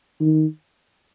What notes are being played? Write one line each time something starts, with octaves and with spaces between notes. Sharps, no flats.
D#3